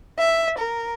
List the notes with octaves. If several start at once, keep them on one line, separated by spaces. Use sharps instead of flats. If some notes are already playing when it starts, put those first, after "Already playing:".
E5
A#4